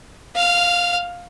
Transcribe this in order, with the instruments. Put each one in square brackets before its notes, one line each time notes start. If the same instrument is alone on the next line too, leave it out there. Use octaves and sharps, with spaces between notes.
[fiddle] F5 F6